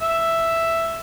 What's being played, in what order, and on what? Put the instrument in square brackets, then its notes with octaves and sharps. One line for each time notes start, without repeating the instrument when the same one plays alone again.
[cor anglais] E5